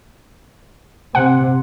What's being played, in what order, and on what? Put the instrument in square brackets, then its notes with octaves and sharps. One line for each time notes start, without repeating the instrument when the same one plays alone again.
[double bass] C3 [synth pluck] F#5